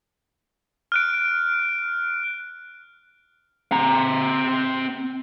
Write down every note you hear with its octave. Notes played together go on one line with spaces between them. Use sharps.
F6 F#6 D7
C4 A#5